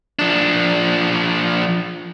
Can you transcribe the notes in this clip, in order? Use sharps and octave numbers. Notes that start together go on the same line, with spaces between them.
F3 D4